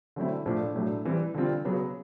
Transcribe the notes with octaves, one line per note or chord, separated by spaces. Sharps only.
D3 F#3 A3 C4 E4
A2 F3 A3 D4
A2 F#3 A3 D4
E3 G3 C4
D3 G3 C4 F4
C#3 F#3 B3